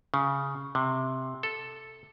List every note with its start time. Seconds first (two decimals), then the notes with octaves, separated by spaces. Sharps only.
0.14 C#3
0.75 C3
1.43 A4